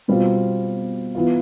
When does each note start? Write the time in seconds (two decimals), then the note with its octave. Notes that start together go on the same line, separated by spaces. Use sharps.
0.08 B2 G3 C4 F4
1.15 E3 B3 F4